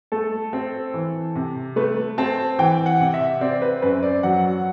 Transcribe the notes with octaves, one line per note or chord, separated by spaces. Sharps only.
A3 A4
C4
E3
C3
A3 B4
C4 A5
E3 G5
F#5
C3
E5
C4 D5
B4
F#2 B4
D5
F#3 F#5